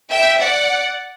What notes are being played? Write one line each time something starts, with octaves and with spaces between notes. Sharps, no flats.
E5 G5
D5 F#5